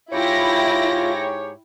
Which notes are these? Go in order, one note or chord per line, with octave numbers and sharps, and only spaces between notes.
G#2 E4 F4 G4 C#5 G5 A#6